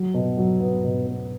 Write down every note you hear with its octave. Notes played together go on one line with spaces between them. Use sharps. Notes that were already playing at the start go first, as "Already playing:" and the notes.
Already playing: F#3
B2
F#3
B3
B2
B3